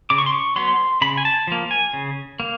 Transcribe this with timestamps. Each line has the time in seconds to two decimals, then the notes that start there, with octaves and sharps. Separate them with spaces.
0.10 C#3 D6
0.18 C#6
0.26 C6
0.33 C#6
0.56 F#3 B3 C6
1.02 C#3 B5
1.17 G#5
1.25 A5
1.47 F3 A#3
1.71 G#5
1.93 C#3
2.40 A#3